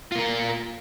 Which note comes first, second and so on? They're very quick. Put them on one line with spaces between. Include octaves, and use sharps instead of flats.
F4 A#3 A#4